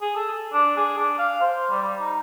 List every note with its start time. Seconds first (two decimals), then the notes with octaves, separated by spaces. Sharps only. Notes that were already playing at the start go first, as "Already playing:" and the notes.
0.02 G#4
0.16 A4
0.53 D4
0.77 G#4
0.98 D4
1.19 F5
1.41 C5
1.70 G3
1.82 G3
2.01 D#4